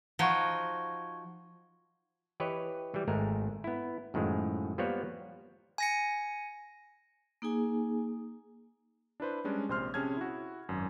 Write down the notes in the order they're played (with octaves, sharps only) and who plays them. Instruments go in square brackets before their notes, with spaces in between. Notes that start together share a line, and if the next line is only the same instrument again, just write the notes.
[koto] F3 D#4 F#4 [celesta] C#6 G#6 G7
[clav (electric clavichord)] E3 G4 B4 C#5 D#5
E3 G3
G#1 G#3 A3 A#4
B3 E4
F#2 A2 D#3 F3 G#3
F3 G3 A#3 B3 C#5 F#5
[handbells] G#5 A#6 C#7
[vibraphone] A#3 D#4 G#4 G#5
[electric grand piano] D4 E4 B4 C5
G3 G#3 C#4 D4
A#1 C3 C5 C6 F6
C3 C#4 G#4 A5 F6 G#6
E4 F#4
G#1 F#2